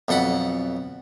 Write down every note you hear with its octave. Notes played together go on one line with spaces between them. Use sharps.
B1 F2 A4 F#5 B5